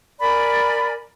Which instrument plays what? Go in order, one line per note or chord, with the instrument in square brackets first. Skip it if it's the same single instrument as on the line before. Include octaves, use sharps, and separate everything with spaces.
[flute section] A#4 D5 G#5 B5